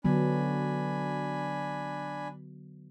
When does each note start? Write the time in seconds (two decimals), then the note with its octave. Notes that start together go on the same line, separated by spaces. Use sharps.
0.05 D3 F#3 B3 D4 G#5 B5